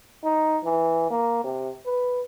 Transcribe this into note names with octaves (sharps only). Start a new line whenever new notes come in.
D#4
E3
A#3
C3
B4